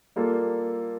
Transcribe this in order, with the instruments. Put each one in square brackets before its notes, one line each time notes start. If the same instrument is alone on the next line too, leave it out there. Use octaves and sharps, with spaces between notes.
[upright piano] G3 A#3 F4 A4